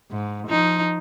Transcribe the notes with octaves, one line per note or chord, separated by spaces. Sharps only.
G#2
F3 D#4